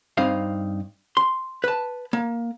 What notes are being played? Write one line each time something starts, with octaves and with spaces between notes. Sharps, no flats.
G2 C4 D#4 F5
C6
B4 A5
A#3